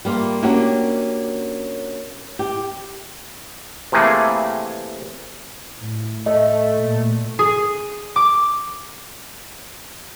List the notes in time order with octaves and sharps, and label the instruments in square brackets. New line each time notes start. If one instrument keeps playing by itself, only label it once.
[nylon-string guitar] G3 A#3 F4
A#3 C#4 D4 F#4 G4
G4
[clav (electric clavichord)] C3 E3 A3 A#3 G#4
[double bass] A2
[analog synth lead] A3 [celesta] D#5
[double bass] A#2
[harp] G#4
D6